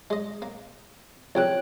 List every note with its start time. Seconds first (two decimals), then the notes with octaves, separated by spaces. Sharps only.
0.10 G#3 D#5
0.42 A#3
1.35 C2 F2 C#3 C#5 G5 F#6